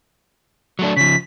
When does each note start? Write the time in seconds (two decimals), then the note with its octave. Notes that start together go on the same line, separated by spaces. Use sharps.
0.79 F#3 A3 D4
0.97 C#3 F3 B6